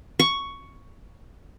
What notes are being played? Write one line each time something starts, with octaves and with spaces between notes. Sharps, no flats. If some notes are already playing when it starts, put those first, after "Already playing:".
C#6